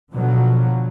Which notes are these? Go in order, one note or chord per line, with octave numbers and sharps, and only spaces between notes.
B2 D3 F3 F#3